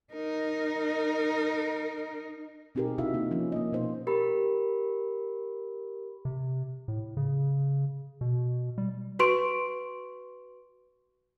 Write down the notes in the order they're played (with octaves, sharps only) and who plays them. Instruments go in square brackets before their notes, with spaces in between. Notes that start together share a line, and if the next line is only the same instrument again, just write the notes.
[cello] D#4 A#4
[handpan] B2 C4 D#4 G4 G#4 A#4
C3 D#4 E4 F#4 E5 F5
A#3 D#4 F4
F3 C#4
A#3 D#5
B2 D#4 C5
[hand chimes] G4 A#4 B5
[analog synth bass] C3
A2
C#3
B2
G3
[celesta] F#4 B4 C6 C#6 D7